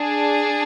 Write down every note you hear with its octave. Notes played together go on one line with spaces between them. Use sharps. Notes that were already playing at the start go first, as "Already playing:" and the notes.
Already playing: D4 G#4